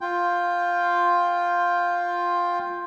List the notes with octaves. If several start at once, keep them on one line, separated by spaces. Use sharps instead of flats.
F4 G5